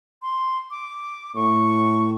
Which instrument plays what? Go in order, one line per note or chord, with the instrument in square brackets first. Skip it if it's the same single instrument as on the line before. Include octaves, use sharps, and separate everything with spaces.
[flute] C6
D6
[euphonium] A2 [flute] C#6